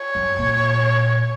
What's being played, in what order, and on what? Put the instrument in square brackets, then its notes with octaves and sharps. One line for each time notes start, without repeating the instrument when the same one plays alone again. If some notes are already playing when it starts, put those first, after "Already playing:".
Already playing: [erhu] C#5
[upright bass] F#2
A#2